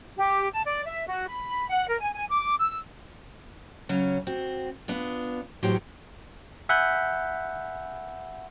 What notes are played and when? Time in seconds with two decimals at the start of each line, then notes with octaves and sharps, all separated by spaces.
0.16 G4
0.52 A5
0.65 D5
0.86 E5
1.07 F#4
1.28 B5
1.69 F#5
1.88 A#4
2.00 G#5
2.14 G#5
2.29 D6
2.58 E6
3.89 C#3 F#3 C#4
4.27 C4 F#4
4.88 B3 D4 F4
5.63 E2 A2 F#3 F#4 G4 C5
6.69 E5 F#5 G#5 B5 F#6 G6